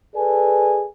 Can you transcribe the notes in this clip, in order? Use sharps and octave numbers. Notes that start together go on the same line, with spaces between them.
G#4 A4 B4 D5 G#5